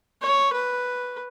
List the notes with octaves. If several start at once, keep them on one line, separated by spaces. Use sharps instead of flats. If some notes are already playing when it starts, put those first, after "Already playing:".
C#5
B4